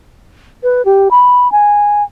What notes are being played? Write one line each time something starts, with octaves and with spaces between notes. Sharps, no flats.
B4
G4
B5
G#5